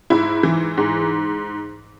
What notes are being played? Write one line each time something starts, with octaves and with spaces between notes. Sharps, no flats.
G#2 E4
E3
G#2